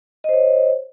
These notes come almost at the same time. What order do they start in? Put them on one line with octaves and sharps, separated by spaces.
D#5 C5 C#5